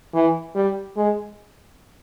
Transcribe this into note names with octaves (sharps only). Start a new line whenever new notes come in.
E3
G3
G#3